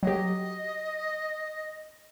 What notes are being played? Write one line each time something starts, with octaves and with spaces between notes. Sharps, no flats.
F#3 G4 D#5